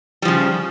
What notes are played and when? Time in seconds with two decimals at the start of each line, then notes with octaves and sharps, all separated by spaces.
0.22 G3
0.25 F3
0.28 C#3